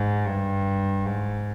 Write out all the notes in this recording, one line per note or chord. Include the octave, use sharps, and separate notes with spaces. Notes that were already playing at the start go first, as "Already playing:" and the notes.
Already playing: G#2
G2
G#2